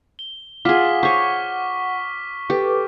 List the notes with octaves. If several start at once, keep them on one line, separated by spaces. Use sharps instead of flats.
G7
F4 G#4 F#5 D6 F6 B6
C5 C#5 C#6 B6
G4 A4 B4 D6